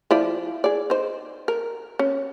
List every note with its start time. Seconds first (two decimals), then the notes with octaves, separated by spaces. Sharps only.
0.11 F3 E4 D5
0.64 G#4 D5
0.90 D#4 C5
1.48 A#4
1.99 C#4